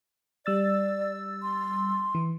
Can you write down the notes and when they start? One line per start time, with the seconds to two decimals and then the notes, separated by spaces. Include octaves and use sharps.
0.46 G3 D5 E6 A6
1.43 C6
2.15 E3